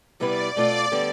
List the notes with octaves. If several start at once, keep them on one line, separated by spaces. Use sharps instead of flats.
C3 G3 B3 E4 B4 D5
B2 A3 C4 F4 D5
D3 G3 B3